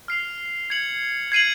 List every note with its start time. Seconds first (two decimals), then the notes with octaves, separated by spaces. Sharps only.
0.08 F6 C7 F7
0.70 G#6 C#7 F#7
1.32 G#6 C7 D#7 F#7